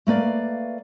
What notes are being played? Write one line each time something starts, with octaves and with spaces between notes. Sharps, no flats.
A3 A#3 B4 D5 F5